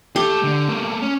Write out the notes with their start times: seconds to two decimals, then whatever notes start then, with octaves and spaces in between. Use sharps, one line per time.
0.16 A3 G4 A4
0.44 D3
0.68 A3 A#3
1.02 C#4